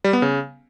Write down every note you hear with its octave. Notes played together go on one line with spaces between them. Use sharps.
G3
B3
C#3